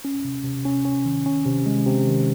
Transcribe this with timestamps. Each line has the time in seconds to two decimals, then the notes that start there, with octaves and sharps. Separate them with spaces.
0.05 C#4
0.25 C3
0.44 C3
0.65 C#4
0.85 C#4
1.05 D#3
1.26 C#4
1.45 C3
1.66 G#3
1.86 C3
2.07 D#3